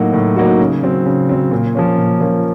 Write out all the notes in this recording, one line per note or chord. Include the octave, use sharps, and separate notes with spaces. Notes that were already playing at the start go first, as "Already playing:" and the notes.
Already playing: A2 F#3 A#3 D#4 F#4
A2
F#3 A#3 D#4 F#4
C#3
F#3 C4
C#3
F#3 C4
A#2
F3 A#3 C#4
A#2
F3 A#3 C#4